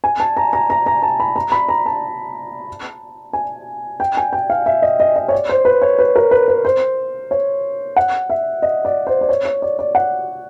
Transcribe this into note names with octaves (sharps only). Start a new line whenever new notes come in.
G#5
A5
A#5
A#5
A#5
A#5
A5
B5
A#5
B5
A#5
A5
G#5
G5
G#5
G5
F5
E5
D#5
D#5
D#5
C#5
D5
C5
B4
C#5
B4
A#4
B4
B4
C5
C#5
F#5
E5
D#5
D5
C5
D5
C#5
C#5
D5
D5
F#5